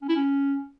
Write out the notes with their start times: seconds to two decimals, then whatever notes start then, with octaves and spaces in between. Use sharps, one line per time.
0.02 C#4
0.09 E4
0.16 C#4